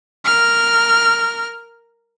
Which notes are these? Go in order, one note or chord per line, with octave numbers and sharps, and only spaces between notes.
A#4 F6